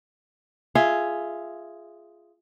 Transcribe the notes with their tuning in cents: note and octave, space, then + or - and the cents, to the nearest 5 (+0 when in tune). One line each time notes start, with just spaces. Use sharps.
F4 -10 G#4 +5 E5 +0